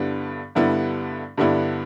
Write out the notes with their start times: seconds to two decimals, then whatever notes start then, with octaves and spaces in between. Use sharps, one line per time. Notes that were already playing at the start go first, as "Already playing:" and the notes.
Already playing: G2 D3 G3 B3 E4
0.55 G2 D3 G3 B3 E4
1.38 G2 D3 G3 B3 E4